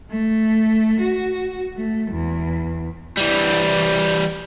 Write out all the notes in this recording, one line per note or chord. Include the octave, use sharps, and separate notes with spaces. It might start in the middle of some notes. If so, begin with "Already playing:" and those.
A3
F#4
A3
E2
E3 G3